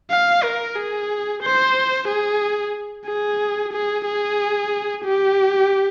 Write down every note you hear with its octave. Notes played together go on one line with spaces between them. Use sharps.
F5
A#4
G#4
C5
G#4
G#4
G#4
G#4
G4